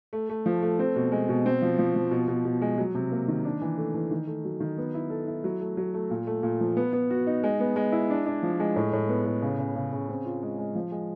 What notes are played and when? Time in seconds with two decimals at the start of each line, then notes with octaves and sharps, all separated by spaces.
0.13 A3
0.29 A3
0.46 F3
0.62 A3
0.79 C4
0.96 B2
1.12 G#3
1.29 B2
1.46 C4
1.62 F3
1.78 F3
1.95 F3
2.11 B2
2.28 B2
2.45 B2
2.62 G#3
2.78 F#3
2.95 C3
3.12 A#3
3.28 D#3
3.45 D4
3.62 E3
3.78 A3
3.94 E3
4.11 D#3
4.27 A3
4.45 F#3
4.60 D#3
4.78 B3
4.94 E4
5.10 A4
5.27 E4
5.44 F#3
5.61 A3
5.77 F#3
5.94 A3
6.10 A#2
6.27 A3
6.43 A#2
6.60 F3
6.77 B3
6.93 B3
7.10 F#4
7.27 D#4
7.43 G#3
7.60 B3
7.76 G#3
7.92 E4
8.10 D4
8.26 D4
8.43 F3
8.60 G#3
8.76 A2
8.93 A2
9.09 B3
9.25 A2
9.42 C#3
9.59 C#3
9.75 C#3
9.93 C#3
10.08 C4
10.25 F4
10.43 G#3
10.58 G#3
10.75 F3
10.92 G#3